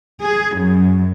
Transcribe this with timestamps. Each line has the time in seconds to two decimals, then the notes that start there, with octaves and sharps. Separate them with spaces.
0.23 G#4
0.58 F#2